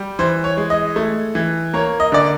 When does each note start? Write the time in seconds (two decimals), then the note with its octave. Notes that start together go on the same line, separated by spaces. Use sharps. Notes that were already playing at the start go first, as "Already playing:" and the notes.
Already playing: G3
0.19 E3 C5
0.44 C#5
0.57 G#3
0.70 D#5
0.96 A3
1.35 E3
1.73 A#3 C#5
2.00 D#5
2.12 D3 D5